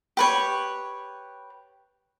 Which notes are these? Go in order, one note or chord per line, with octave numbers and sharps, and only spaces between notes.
G4 B4 C#5